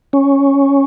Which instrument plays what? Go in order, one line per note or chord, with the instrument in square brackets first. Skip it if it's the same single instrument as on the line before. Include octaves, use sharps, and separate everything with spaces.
[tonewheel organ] C#4